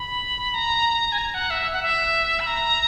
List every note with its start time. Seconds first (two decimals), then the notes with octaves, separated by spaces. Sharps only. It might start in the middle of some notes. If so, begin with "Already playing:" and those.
Already playing: B5
0.54 A#5
1.12 G#5
1.18 A#5
1.34 F#5
1.50 E5
1.73 F#5
1.83 E5
2.40 B5
2.47 A#5